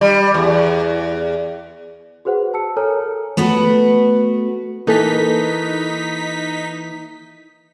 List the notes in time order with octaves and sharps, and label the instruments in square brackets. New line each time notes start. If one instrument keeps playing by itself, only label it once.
[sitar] G3
E2
[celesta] F#4 G#4 B4 C5 F#5
A5 E6 C#7
A4 A#4 C#5 G#5 A#5 F6
[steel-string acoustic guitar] A3 B3 F#4 B4
[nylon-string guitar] E3 A#3 A4 [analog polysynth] D#4 B6